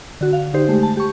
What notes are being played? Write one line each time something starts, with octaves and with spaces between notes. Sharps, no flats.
D3 F#4
F5
D3 D#4 G4 C5
G#3 A3 G4
A5
G4 C#6